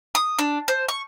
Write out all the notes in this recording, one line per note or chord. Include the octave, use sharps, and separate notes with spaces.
D#6
D4
C5
C#6